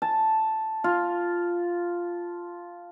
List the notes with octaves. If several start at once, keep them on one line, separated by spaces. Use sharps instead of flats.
A5
F4